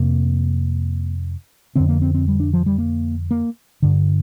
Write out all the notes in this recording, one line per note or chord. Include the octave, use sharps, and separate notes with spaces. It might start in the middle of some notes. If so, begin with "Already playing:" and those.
Already playing: F2 C3 A#3
F2 D3 C4
A#3
C4
C4
G3
D4
F3
G3
A#3
A#3
G2 D3